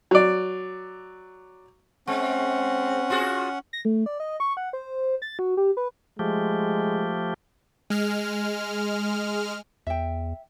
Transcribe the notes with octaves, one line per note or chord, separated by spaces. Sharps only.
F#3 D5
G#3 C4 C#4 F#5
F4 F#4 G#4
A#6
A3
D5
D#5
C#6
F#5
C5
A6
F#4
G4
B4
F3 G#3 A3 G4
G#3 F6
E2 E5 G5